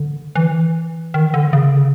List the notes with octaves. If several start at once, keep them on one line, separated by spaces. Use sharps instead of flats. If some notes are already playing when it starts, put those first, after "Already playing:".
Already playing: D3
E3
D#3
D3
C#3